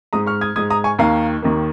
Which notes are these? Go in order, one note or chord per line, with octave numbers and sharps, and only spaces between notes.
G#2 G#3 A#5 D#6
C#6 F6
D#6 G#6
G#2 G#3 D#6 G#6
A#5 D#6
G#5 C#6
D#2 D#3 A#3 F5 A#5
D#2 D#3 A#3